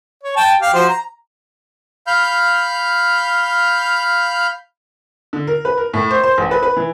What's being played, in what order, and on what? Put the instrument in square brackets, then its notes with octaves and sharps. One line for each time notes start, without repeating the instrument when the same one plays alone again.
[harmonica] C#5
G5 A5
G4 F5
F3 F#4 C5
A#5
[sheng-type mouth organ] F5 B5 F6 G6
[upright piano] D3
A#4
B4
A#4
A2
C5
C5
A1
B4
B4
E3